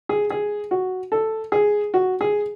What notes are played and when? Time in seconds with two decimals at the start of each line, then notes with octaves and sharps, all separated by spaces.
0.09 G#4
0.30 G#4
0.71 F#4
1.12 A4
1.52 G#4
1.94 F#4
2.21 G#4